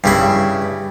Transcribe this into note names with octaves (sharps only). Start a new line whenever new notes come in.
G2 C#3 E4